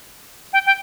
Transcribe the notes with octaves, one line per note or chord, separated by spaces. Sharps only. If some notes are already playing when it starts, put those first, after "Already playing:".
G5
G5